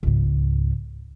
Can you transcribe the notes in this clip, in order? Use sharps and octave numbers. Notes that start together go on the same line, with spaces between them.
C#2 G#2